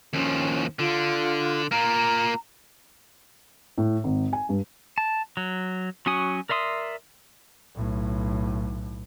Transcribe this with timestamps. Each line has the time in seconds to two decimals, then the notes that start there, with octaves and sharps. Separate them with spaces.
0.13 D#2 F3 C#4
0.79 D3 F4
1.71 A#3 F4 A#5
3.78 A2
4.04 G#1
4.33 G#5
4.49 G2
4.98 A5
5.37 F#3
6.06 F#3 C#4 F#4 G#5 D#6
6.49 A#4 D5 E5 C6 D#6
7.75 B1 A2